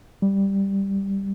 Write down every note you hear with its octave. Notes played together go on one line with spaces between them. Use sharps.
G3